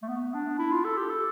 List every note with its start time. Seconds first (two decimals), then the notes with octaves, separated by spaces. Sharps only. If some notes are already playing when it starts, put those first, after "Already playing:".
0.03 A3
0.08 B3
0.34 D4
0.59 E4
0.72 F4
0.84 A4
0.97 G4
1.09 A4